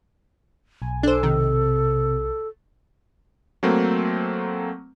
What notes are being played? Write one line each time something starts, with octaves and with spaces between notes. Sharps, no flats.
B1 G#5
D4 A4 C5
C3 D#3
F#3 A3 A#3 C4